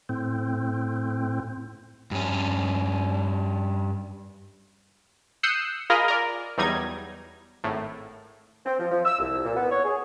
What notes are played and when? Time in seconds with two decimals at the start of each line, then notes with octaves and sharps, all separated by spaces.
0.09 A2 C4
2.11 G2 C#4
5.43 D#6 E6 F#6 G6 C7 C#7
5.90 F4 G#4 A#4 D#5 F5 B5
6.08 A#4 D5
6.58 E2 F#3 G3 D#4 G#6 A#6
7.64 G#1 A2
8.66 C4
8.79 F3
8.91 F3
9.05 E6
9.19 C2
9.45 A#2
9.56 B3
9.71 C#5
9.84 G#4